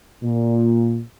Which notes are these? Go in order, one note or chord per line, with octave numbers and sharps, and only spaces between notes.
A#2